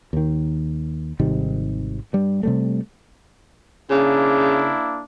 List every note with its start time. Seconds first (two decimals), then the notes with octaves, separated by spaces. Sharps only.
0.13 D#2 D#3
1.19 G#1 C3 D#3 G3
2.13 G2 G3
2.43 C3 G3 A3
3.90 C#3 A#3 D4 E4